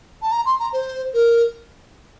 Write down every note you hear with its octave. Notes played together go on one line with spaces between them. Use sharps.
A5
A#5
C6
A#5
C5
A#4